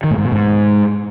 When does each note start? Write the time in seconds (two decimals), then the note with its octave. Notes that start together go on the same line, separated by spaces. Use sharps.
0.04 D#3
0.11 A2
0.18 G#2
0.25 B2
0.32 G#2